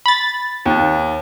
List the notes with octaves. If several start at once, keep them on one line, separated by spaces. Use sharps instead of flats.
B5 A6
D#2